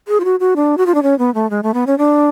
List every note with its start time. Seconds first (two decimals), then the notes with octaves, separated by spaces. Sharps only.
0.08 G#4
0.20 F4
0.25 F#4
0.40 F#4
0.56 D4
0.77 F#4
0.86 F4
0.95 D4
1.03 C#4
1.19 B3
1.35 A3
1.50 G#3
1.63 A3
1.74 B3
1.87 C#4
1.98 D4